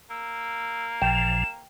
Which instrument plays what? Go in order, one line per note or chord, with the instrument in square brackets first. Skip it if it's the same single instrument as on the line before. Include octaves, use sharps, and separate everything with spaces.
[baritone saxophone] A#3 [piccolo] E6
[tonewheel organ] A1 A#2 F3 [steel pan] G5 [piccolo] E7